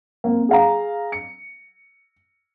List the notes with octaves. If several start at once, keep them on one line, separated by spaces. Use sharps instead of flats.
A#3 C4
G#4 F5 A#5
C#7